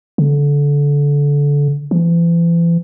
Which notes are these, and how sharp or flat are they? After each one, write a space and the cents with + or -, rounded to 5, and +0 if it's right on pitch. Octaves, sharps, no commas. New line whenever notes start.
D3 -25
E3 +40